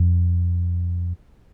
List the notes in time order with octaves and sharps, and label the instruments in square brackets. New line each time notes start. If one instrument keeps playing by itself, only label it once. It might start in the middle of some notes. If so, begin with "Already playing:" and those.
Already playing: [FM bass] F2